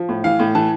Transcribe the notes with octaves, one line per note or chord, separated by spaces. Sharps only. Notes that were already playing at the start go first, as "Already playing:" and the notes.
Already playing: F3
A2
E3 F5
A2
E3 A5